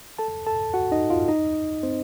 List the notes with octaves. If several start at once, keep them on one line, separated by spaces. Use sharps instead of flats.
A4 A5
A4 A5
F#4 F#5
D#4 D#5
F4 F5
D#4 D#5
C4 C5